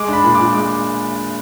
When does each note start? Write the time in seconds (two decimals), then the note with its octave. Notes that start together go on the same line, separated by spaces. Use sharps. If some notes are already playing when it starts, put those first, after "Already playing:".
Already playing: G#3 D6
0.08 D4 B5
0.24 A#2
0.35 A#2 D6
0.55 G#3 D6